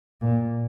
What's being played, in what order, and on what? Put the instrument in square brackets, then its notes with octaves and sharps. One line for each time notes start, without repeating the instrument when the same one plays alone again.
[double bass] A#2